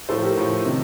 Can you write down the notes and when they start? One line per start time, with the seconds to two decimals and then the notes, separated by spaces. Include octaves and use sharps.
0.09 A2 F3 A4 C5
0.23 G4 A#4
0.37 A2 F3
0.65 C3 D#3